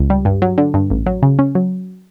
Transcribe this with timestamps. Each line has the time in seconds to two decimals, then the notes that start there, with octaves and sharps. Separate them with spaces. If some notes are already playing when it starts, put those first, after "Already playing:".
Already playing: C#2
0.10 G3
0.25 G2
0.42 F#3
0.58 D3
0.74 G2
0.90 A1
1.06 F#3
1.23 C#3
1.39 C#4
1.55 F#3